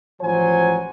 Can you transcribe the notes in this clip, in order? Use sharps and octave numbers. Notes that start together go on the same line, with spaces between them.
A1 F3 F#3 C5 G#5